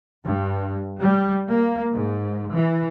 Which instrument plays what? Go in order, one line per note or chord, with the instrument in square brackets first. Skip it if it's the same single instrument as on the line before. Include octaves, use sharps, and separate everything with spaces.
[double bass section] G2
G3
A#3
G#2
E3